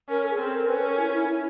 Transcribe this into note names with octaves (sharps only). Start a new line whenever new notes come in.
C#4 A#4
A4
G#4
C4 A4
A#4
C#4 B4
A4
A#4
E4
E4
E4